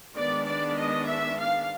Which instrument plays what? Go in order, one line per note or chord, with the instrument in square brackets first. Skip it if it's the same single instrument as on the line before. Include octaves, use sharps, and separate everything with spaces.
[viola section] D#3 G#3 B3 D4 D5
D5
D#5
E5
F5